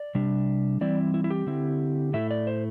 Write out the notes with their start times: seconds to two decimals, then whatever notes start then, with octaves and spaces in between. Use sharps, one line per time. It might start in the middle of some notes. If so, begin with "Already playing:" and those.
Already playing: D5
0.15 C3 G3 D4
0.81 E3 G3 C4 E4 D5
1.14 E4
1.24 E4
1.30 G4
1.47 D3 C4 E4
2.13 A2 A3 E4 E5
2.31 D5
2.47 C5